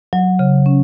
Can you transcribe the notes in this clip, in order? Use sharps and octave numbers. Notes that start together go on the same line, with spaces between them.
F#3
C#3
C#4